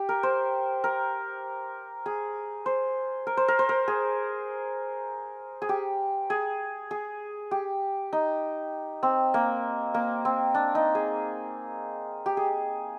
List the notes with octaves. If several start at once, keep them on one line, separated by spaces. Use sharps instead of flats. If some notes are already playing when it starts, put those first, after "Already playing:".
Already playing: G4
A#4
C5
A#4
G#4
C5
A#4
C5
A#4
C5
A#4
G#4
G#4
G4
G#4
G#4
G4
D#4
C4
A#3
A#3
C4
D4
D#4
G#4
G4
G#4